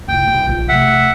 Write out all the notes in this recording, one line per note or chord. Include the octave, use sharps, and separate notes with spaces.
F1 E4 G5
B1
A#1 F3
C3 A3 E5 F#5